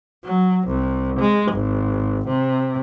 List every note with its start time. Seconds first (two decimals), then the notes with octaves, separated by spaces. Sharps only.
0.25 F#3
0.67 C2
1.19 G#3
1.52 G#1
2.28 C3